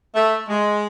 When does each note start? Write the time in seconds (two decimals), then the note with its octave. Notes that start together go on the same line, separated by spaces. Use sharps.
0.15 A3
0.48 G#3